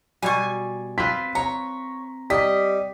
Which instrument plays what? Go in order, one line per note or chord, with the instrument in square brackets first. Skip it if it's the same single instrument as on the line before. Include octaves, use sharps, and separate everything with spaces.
[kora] B2 G3 [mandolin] G#5 C#6
[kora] C4 F4 B4 [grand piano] B6
[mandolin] C#5 [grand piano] A#5
[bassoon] G3 [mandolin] D#5 [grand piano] B6